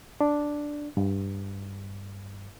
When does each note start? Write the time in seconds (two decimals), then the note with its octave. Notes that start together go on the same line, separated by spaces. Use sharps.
0.21 D4
0.97 G2